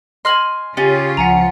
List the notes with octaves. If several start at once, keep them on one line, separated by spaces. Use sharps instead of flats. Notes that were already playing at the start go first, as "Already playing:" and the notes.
D#5 G#5 C6 F6 F#7
C#3 C#4 F4 G4 G#4 C#5 A6
C#2 F3 F#5 G#5 A#5 C#7